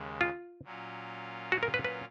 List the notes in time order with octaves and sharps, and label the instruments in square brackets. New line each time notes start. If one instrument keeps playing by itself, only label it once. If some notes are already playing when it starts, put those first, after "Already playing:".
Already playing: [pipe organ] D#2 C#3 G#3
[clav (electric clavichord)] F4
[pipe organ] A#2 F#3 C#4 F4
[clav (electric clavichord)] F#4
A#4
B4
B4